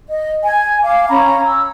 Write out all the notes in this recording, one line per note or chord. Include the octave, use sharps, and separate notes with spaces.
D#5
G#5
F5 D6
C#4 A#5 B5
E6